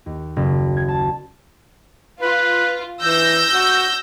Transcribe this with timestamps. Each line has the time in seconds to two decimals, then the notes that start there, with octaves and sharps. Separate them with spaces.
0.06 D#2
0.36 F#1
0.77 G#6
0.88 A5
2.21 F4 B4
3.02 E3 E6 G6 A#6
3.53 F#4